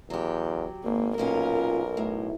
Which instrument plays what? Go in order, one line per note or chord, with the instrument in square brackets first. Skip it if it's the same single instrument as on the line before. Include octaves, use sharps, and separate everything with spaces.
[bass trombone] E2 [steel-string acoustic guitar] F#3 G4
[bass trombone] G#1 [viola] A#3
[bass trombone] B1 [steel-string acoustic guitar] A#2 C#4 F4 [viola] A#4
[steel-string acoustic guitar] A2